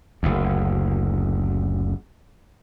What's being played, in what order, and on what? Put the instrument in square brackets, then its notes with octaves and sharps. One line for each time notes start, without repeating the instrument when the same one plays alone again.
[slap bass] F#1 D2